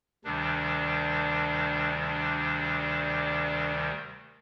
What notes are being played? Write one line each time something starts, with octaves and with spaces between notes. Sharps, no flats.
D2 C3 D#3 G3 D4
D4